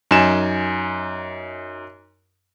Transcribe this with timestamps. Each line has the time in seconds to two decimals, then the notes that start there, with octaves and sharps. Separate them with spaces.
0.11 F#2 D#4 G#5 E7